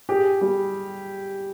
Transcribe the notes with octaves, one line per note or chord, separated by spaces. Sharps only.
G4 G#4
G3